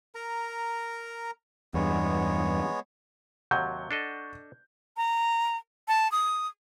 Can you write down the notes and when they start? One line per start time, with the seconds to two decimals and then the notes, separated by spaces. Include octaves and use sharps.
0.15 A#4 A#5
1.74 E2 G2 G#3 B3 C#5
3.51 D#2 C3 F#3 F#5 C#6 G6
3.91 D4 A4 D#5
4.97 A#5
5.88 A5
6.12 D#6